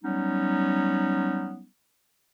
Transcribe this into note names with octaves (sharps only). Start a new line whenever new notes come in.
F#3 G3 B3 C#4 D#4